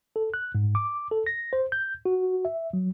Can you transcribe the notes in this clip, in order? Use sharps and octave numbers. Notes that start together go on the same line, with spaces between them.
A4
F#6
G#2
D6
A4
A#6
C5
G6
F#4
E5
F#3